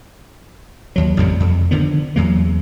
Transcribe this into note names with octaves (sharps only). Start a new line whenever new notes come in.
D#2 F#3
A1 F2 C3 G3
F2
D3 D#3 F3 B3
E2 F#3 A#3